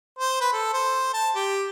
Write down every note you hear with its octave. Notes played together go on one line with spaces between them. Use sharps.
C5
B4
A4
C5
A5
G4